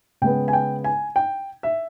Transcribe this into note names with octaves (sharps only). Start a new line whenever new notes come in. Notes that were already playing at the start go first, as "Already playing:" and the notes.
C#3 G#3 B3 G5
G#5
G5
G#5
G5
E5